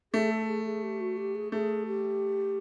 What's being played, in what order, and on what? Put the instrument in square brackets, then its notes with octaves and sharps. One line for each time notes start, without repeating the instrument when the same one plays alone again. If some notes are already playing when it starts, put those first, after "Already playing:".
[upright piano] A3 [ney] G#4
[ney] A4
G#4
G#4
G4
F#4
G4
G#4
[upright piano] A3 [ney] G#4
[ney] G4